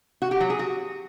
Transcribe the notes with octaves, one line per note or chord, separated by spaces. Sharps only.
F#4
G4
F#3
G#4
F#4